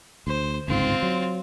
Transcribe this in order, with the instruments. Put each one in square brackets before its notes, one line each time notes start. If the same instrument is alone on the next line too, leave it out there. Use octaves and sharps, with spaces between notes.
[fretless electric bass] D2 [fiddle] C5
[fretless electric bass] G1 C#2 G#2 [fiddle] C4 F4
[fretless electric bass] F#3